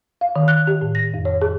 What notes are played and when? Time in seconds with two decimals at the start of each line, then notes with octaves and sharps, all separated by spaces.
0.21 F5
0.36 D#3
0.48 F#6
0.67 G4
0.81 A2
0.95 A#6
1.14 F2
1.25 C#5
1.42 G#4